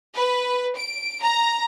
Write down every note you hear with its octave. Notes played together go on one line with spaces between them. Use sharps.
B4
D7
A#5